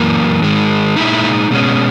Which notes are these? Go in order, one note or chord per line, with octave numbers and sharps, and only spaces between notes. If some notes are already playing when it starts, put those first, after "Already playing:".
Already playing: F#2 E3 A#3
G#2 D#3 G#3
A#2 G#3 D#4 E4
B2 G#3 C#4